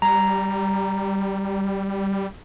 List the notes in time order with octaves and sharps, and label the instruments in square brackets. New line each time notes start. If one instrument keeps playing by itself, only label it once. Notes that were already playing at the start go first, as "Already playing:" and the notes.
[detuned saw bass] G3 [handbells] A#5